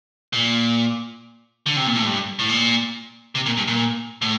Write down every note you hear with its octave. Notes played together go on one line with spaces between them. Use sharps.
A#2
D3
C3
A#2
A2
G2
A2
A#2
C3
A#2
G2
A#2
A2